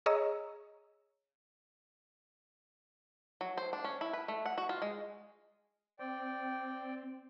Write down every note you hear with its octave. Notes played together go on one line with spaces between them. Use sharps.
G#4 C#5 D#5 A#5 E6
F#3
C5
D4
C#4
E4
B4
A3
F#5
F#4
F4
G#3
C4 D5 G5